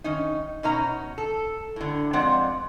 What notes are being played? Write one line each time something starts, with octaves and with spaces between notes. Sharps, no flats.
D#3 C#4 D#4
B2 C#4 D#4 A#5
A4
A2 D3
F2 G#3 C4 D5 F#5